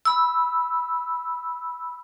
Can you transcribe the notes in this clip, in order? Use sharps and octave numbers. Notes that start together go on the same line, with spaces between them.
B5 E6